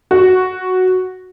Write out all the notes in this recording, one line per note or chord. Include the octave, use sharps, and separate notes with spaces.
F#4